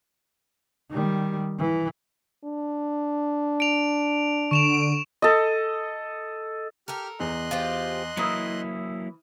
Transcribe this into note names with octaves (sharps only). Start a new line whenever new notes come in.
D#3 G3
E3
D4
D7 F7
D3 C#6 D7 E7 F7
A4 D#5
G4 A4 A#4 F6
E2 D#5 C6 F#6
F4 G4 C5
E3 F#3 A#3 E4 A#5 D#6 E6